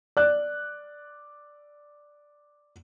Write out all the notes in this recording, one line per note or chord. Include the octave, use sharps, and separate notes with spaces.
D5 F#6